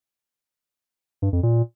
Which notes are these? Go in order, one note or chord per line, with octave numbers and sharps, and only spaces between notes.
G2
F2
A#2